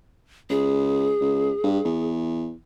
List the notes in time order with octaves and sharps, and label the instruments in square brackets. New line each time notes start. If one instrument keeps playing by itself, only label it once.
[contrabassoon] C#2 [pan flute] G#4
[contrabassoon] C#2
G2
E2